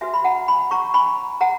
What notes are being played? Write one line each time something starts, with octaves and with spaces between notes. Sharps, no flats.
F#4 B4 E5 G#5
B5
F#5 A#5
G#5 B5
A#5 C#6
G#5 B5
F#5 A#5